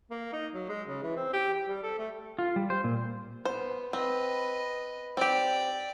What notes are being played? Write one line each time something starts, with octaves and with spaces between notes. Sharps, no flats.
A#3
D#4
F#3
G#3
C#3
E3
C4
G4
G4
G3
A4
A3
F4
G3
C5
A#2
B3 C5
C4 B4 D#5
C4 G4 D5 G5